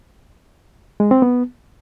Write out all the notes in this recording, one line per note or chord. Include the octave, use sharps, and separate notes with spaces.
G#3
C4
B3